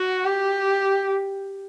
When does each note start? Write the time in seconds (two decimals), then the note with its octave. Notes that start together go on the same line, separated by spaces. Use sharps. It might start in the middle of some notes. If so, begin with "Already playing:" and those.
Already playing: F#4
0.25 G4